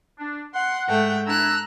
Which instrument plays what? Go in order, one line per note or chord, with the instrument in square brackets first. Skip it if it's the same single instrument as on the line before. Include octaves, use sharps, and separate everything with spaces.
[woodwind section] D4
[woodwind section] F#5 [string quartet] C6
[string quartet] G#2 A3 G5
[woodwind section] D4 E4 [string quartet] A#5 E6 F#6